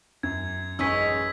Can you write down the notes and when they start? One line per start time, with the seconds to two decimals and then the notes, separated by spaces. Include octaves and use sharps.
0.23 F#2 G#6
0.79 A1 F#2 G#3 C#4 D#4 E6 B6